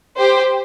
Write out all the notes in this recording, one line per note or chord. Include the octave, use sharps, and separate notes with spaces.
G4 C5